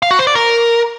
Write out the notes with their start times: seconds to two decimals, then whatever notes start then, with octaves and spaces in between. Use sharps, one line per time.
0.03 F5
0.11 F#4
0.19 C5
0.27 D5
0.35 A#4